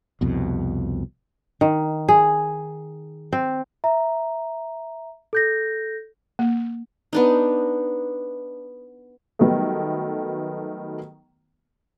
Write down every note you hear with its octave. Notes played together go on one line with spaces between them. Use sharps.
C2 F2 B2
D#3
G#4
C4
E5 A#5
A4 G6 A#6
A#3
B3 D4 D#4
D#3 F#3 G3 A3 B3